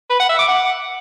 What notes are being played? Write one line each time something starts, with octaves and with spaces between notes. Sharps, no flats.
B4
F#5
E5
D6
F#5